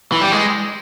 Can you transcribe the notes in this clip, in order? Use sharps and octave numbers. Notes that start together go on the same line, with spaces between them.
E3
G3
G#3